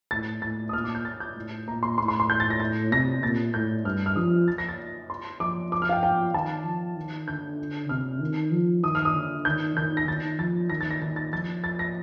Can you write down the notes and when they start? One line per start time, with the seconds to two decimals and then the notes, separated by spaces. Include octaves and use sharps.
0.11 A2 A6
0.42 A2 A6
0.69 D#6
0.73 A#2 F6
0.84 D6
0.95 G6
1.05 A6
1.20 G6
1.36 A2
1.67 A#2 A#5
1.83 C6
1.98 A2 C6
2.08 C6
2.20 C6
2.30 G6
2.40 A6
2.50 A#6
2.60 A6
2.92 C3 A#6
3.23 A#2 A6
3.54 A2 G6
3.85 G2 F6
4.06 F6
4.16 F3 D#6
4.48 A6
4.58 A#6
4.69 A6
5.10 C6
5.40 F3 D6
5.72 D6
5.82 F6
5.89 F5
5.92 G5
6.03 G5
6.34 D#3 A5
6.65 F3
6.96 D#3
7.28 D3 G6
7.89 C3 F6
8.21 D#3
8.52 F3
8.83 D#3 D#6
8.95 F6
9.05 D#6
9.14 D3
9.45 D#3 G6
9.77 D#3 G6
9.97 A#6
10.08 D#3 A6
10.39 F3 A6
10.70 D#3 A#6
10.81 A6
10.91 A#6
11.02 D#3 A6
11.16 A6
11.32 F3 A6
11.64 A6
11.79 A#6